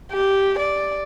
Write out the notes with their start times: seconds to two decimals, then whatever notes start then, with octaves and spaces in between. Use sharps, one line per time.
0.13 G4
0.59 D5